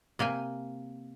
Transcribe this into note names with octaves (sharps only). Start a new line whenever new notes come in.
C3 A#3 G5 G#5